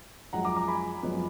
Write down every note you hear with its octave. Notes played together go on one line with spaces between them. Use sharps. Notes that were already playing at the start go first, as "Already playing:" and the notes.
F#2 F3 G#3 F#5 A#5
A#5 D6
A#5 D6
G#5 B5
F#2 F3 G#3 B3